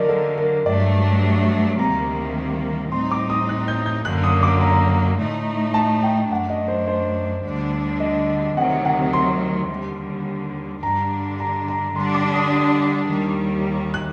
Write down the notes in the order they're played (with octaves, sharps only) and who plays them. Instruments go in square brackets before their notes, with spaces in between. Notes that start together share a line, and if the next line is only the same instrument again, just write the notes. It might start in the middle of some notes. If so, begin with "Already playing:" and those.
Already playing: [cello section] D3 F#3 A#3 [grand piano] A#4 D5 D#5
[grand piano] A4
A#4
[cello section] G2 F#3 A3 D4 [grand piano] D5
[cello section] D2 C3 D#3 G3 A#3 [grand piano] A#5
[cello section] A2 G3 C4 D#4 [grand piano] C6
[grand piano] D6
D#6
F#6
G6
G6
[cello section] F#2 D3 F#3 A#3 [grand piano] F#6
[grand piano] D#6
D6
A#5
[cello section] A2 A3 D#4
[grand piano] A5
G5
[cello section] F#2 F#3 A3 D4 [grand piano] F#5
[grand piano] D#5
C5
C5
[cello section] D2 D3 G3 D4
[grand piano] D#5
[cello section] D2 C3 D#3 F#3 [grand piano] F#5
[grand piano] F#5
C6
[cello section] D#2 D3 G3
[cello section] G2 D3 G3 D4 [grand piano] A#5
[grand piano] A#5
A#5
[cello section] D3 G3 D4 [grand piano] C6
[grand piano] D6
D#6
D#6
[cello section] D#2 D#3 G3
[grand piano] F#6